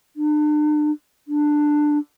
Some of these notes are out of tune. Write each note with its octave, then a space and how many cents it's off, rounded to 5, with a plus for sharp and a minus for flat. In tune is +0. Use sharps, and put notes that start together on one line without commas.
D4 +40
D4 +15